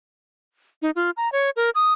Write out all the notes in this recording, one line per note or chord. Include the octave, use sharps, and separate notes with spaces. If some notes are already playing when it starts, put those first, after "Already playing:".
D#4
F4
A#5
C#5
A#4
D#6